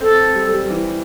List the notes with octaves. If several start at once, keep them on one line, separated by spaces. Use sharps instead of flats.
C4 A4
G3
G3
E3